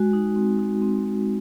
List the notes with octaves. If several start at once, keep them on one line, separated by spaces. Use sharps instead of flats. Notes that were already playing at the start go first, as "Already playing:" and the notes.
Already playing: G#3 F#4
D#4
C4
D#4
C4
C4